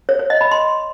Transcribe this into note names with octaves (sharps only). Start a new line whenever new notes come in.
C#5
C#5
D#5
B5
C6